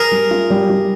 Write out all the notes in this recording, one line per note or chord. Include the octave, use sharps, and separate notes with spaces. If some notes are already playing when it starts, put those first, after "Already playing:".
Already playing: G#4 A#4
G3
F4
G3
G3